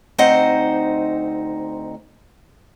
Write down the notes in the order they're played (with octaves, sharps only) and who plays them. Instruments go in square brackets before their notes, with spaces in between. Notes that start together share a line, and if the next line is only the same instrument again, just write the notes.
[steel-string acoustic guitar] D2 C4 D#4 C5 D#5 F#5